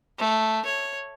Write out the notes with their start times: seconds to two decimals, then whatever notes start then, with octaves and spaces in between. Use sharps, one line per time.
0.18 A3
0.65 C#5